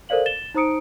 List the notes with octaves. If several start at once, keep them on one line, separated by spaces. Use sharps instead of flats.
A4 A#4 C5 D5 F5 F#7
A6 E7 G7
D#4 C5 A#5 D#6 C#7 D7